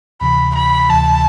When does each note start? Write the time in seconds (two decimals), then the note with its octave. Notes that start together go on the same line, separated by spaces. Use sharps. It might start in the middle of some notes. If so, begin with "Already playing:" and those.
0.21 D2 C3 E3 B5
0.55 B5
0.89 D2 C3 E3 A5